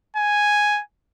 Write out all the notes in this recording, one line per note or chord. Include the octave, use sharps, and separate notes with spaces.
G#5